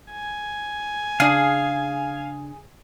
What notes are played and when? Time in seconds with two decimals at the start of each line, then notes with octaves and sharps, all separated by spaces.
0.11 G#5
1.20 C#3 D4 G#4 F5